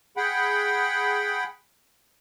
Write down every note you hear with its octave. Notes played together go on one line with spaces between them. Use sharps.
G#4 F#5 G5 B5